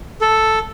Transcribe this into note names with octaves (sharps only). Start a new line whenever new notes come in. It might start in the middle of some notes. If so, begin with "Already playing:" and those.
A4